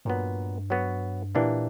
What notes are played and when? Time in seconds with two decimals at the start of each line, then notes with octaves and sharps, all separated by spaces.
0.05 G2 A#2 F#3 B3
0.70 F#3 B3 F#4
1.35 A#2 E3 A#3 D4 G4